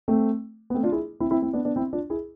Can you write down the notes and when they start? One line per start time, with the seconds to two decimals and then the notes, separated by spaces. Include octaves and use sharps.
0.08 A3 C4
0.70 B3
0.75 A3 C4
0.83 D4 F4
0.92 E4 G#4
1.20 C4 E4
1.31 C4 E4
1.42 C4 E4
1.53 B3 D4
1.65 B3 D4
1.76 C4 E4
1.93 D4 F4
2.10 E4 G#4